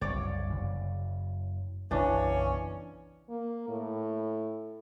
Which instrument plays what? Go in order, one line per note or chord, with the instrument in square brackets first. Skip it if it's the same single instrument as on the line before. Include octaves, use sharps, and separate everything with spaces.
[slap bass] F#1 C2 [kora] C#5 D5
[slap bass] F#1 C#3
[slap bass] F#1 B1 C#3 [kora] E3 D4 [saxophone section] C#4 C#5
[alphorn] A#3
A2